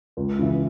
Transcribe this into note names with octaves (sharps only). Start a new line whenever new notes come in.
C#2
C#3 E3